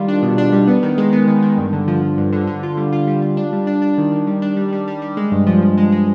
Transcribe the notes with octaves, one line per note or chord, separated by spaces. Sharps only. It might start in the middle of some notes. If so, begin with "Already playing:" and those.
Already playing: D#3 G3 F4
D4
B2
D4
G3
B3
D#3
G#3
B3
D#3
D#3
G2
D3
F3
F3
G2
D3
D3
F4
G3
F4
G3
F4
D4
G3
D4
D4
D#3
D#3
G3
D4
G3
G3
G3
G3
G#3
G2
F3
F3
G#3
G#3